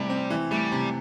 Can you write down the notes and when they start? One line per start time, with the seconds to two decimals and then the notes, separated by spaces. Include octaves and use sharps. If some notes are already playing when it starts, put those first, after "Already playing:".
Already playing: C3 E3 G3 A3
0.10 C4
0.30 E3
0.51 G3 A3
0.72 C3